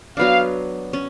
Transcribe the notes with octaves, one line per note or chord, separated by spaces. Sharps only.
F#3 B3 D4 F5
C#4